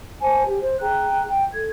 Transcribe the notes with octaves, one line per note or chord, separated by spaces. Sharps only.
C5 G#5 A5
G4
C5
G#4 G5 A#5 F#6
G5
A4 G#6